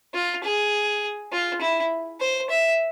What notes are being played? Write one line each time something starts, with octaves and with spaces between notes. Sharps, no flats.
F4
G#4
F4
E4
C5
E5